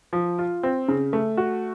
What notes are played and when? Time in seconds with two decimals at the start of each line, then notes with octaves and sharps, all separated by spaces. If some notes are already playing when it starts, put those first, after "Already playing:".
0.13 F3
0.39 F4
0.63 C4
0.88 C#3
1.13 A3
1.37 F#4